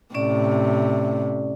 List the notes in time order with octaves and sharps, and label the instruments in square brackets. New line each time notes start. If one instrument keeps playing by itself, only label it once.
[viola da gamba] A2 C3 [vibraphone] C#4 D5